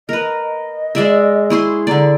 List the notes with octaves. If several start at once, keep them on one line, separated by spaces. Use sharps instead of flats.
A#4 B4 D#5
G#3 D5 E5
E4 G#4 C6 C#6
D3 D5 A#5